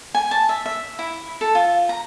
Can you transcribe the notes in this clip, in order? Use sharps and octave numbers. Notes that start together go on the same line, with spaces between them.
G#5
A5
E5
E5
E4
A4
F4
A#5